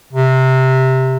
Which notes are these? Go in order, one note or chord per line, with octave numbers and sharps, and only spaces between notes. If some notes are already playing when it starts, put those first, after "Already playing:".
C3